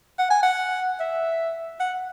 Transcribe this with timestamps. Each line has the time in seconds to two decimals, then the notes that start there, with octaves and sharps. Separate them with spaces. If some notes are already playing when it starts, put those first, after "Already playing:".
0.19 F#5
0.30 G#5
0.43 F#5
1.00 E5
1.80 F#5